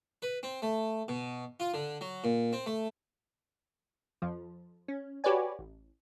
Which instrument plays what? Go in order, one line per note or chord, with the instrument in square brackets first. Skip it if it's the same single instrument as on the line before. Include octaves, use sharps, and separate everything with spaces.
[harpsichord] B4
C4
A3
B2
F4
D3
F#3
A#2
C4
A3
[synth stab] F2 F3
C#4
F#4 G4 B4 C#5 D5 G#5
A1